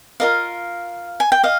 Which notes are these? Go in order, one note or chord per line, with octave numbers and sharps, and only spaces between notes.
F4 A#4 D#5 F5
G#5
G5
D#5 F5